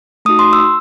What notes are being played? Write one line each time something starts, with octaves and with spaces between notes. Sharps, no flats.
A3 D#4 F#4 D#6
C6
E6